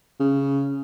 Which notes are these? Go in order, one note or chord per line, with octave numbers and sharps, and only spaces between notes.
C#3